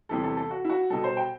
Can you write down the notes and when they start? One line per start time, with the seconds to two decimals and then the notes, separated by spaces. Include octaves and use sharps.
0.09 E2 C3 E3 G3 A4
0.24 A4
0.37 A4
0.51 F#4
0.64 E4
0.69 F#4
0.90 B2 G3 A4
1.04 C5
1.17 G5